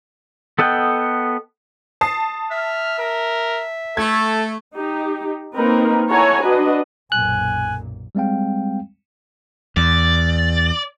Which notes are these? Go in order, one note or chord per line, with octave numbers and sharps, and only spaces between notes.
B3 A4 D#5 F#5 G5
A5 D#6 C7
E5 F6
A#4
A3 A4 G#6
D#4 G4
A#3 C4 D#4 A#4 B4
E4 A4 C#5 F#5 G#5 A#5
D4 F#4 B4 D#5
B1 F#2 A#2 G#5 F#6
G3 G#3 C4 F5 G5
E2 D5